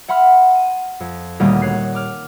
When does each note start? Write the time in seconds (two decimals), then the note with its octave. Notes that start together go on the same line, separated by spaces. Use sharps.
0.08 E5 F#5 B5 C6 F6
0.55 D#7
1.00 F2
1.40 D#1 D2 G3 A#3 D#5
1.62 C#5 F#6 C7
1.94 D6 F6